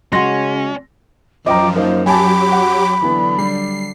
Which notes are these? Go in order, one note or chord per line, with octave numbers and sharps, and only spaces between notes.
C#3 G#3 C#4 F#4 C6 A#6
F#2 F3 D#5 G5 A#5 D6
A#3 D#4 A#4 C5
F#3 G4 G#5 A5 B5 D6
F#5
D3 E3 F#3 B3 D4
G3 C7